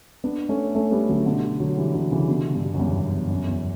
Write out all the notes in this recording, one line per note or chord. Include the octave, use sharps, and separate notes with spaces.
B3 D4
A3 C#4
A3 C#4
G3 B3
D3 F#3
B2 D3
D3 F#3
E3 G3
D3 F#3
C#3 E3
B2 D3
G2 B2
F#2
E2 G2
F#2
E2